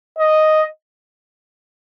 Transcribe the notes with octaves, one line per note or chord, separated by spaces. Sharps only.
D#5